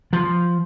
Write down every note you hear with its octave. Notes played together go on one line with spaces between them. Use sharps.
F3